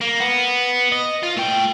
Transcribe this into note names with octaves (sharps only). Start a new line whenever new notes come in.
A#3
B3
D#5
F4
A3 G5